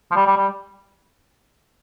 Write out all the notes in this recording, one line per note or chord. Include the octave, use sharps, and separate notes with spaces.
F3
G3
G3
G3